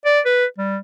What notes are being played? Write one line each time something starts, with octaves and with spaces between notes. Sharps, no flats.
D5
B4
G3